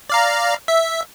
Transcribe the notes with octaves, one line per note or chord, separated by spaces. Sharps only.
D5 F5 A#5
E5